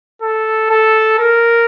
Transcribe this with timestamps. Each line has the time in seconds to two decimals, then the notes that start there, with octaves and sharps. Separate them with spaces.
0.21 A4
0.70 A4
1.19 A#4